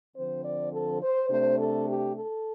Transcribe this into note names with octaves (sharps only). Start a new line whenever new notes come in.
D3 F3 C4 C5
D5
A4
C5
C3 A3 D4 C5
A4
G4
A4